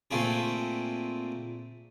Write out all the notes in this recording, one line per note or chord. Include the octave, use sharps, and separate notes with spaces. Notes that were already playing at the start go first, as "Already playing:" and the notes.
A#2 A3 C4 G#4